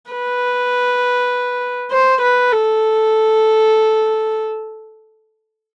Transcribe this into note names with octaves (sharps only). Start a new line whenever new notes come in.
B4
C5
B4
A4